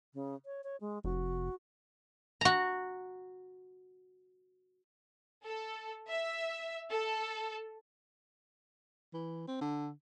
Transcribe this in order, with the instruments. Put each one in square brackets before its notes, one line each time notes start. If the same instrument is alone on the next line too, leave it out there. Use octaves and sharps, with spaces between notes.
[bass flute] C#3
C#5
C#5
G#3
[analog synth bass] F1 [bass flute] F#4
[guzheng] F#4 A#5
[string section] A4
E5
A4
[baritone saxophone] E3
C4
D3